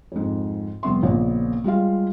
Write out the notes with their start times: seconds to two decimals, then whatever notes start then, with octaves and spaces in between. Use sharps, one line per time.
0.12 F2 G#2
0.83 F1 G3 B3 E5 C6
1.03 A#1 A#2 C#3 B3
1.64 G3 G#3 F4 F5